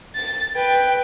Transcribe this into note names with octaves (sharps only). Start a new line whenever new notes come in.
A6
B4 G5